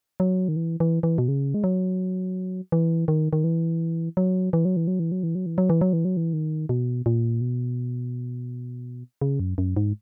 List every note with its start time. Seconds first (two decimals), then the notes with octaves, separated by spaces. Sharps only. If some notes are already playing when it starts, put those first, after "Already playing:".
0.20 F#3
0.48 D#3
0.56 E3
0.80 E3
1.03 E3
1.18 B2
1.28 C#3
1.54 G#3
1.64 F#3
2.72 E3
3.08 D#3
3.33 D#3
3.44 E3
4.17 F#3
4.53 E3
4.65 F#3
4.77 E3
4.87 F#3
4.99 E3
5.12 F#3
5.23 E3
5.35 F#3
5.46 E3
5.58 F#3
5.70 E3
5.81 F#3
5.93 E3
6.05 F#3
6.17 E3
6.33 D#3
6.69 B2
7.06 A#2
7.41 B2
9.22 C#3
9.40 F#2
9.58 F#2
9.77 G#2